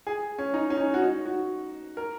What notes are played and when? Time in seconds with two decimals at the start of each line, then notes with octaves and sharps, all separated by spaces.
0.07 G#4
0.38 C#4
0.54 D#4
0.70 C#4
0.77 D#4
0.94 F#4
1.02 D#4
1.26 F#4
1.97 A#4